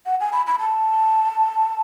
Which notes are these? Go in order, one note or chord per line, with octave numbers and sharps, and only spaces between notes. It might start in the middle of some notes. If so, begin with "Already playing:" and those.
F#5
G#5
B5
B5
A5